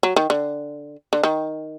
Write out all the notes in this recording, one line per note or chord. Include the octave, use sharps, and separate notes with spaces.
F#3
D#3
D3
D3
D#3